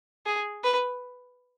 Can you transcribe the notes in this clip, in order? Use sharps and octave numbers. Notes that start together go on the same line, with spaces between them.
G#4
B4